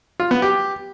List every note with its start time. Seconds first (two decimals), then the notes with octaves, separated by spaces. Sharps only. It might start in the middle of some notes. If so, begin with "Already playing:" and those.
0.20 F4
0.31 B3
0.42 G4